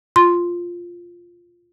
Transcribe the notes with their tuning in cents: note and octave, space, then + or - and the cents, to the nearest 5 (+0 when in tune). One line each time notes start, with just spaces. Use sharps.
F4 +0 C6 +0